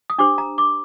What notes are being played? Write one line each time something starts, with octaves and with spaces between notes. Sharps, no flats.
D#6
D4 G4 C5 D6
A#5
D6